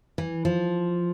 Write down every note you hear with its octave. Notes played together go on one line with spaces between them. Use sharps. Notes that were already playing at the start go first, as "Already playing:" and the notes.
E3
F3